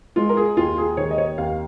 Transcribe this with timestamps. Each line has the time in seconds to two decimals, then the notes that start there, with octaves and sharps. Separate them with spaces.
0.16 G#3 F4
0.29 A#4
0.37 G#4
0.57 D#2 F4
0.78 G#4
0.97 D#3 C#5
1.11 D#5
1.18 C#5
1.38 D#2 F5